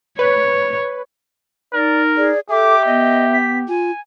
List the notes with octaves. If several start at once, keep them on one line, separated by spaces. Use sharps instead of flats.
B4 C#5
D#4 A#4 D5
G#4 D5
G4 A4 E5 D6
B3 D#5
B6
F4 G#5